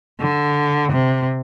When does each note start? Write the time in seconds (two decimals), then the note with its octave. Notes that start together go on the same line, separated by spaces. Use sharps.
0.20 D3
0.92 C3